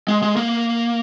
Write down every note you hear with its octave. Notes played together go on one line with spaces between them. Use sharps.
G#3
G#3
A#3